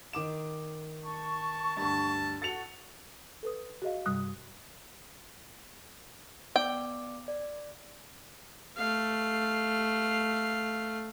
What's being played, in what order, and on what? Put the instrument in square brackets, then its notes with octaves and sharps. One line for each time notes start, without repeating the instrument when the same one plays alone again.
[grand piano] D#3 D6 E7
[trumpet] A5 [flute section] C#6
[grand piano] D2 G2 [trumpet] A5
[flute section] F#4 [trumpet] A4 [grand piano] A6 C#7 F7
[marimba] A4 B4 D#6
F#4 G#4 D#5 F5
G2 C3 G3 D#6 F#6
[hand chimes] B3 D5 D6 [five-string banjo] G5
[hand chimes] D5
[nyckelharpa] A3 F5